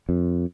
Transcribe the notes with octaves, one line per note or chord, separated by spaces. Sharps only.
F2